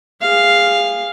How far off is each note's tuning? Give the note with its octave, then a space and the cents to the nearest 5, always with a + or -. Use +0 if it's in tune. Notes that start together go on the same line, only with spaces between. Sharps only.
G#4 -25 F5 +0